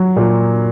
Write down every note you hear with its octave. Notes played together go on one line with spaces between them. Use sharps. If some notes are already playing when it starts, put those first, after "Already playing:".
Already playing: F#3
A#2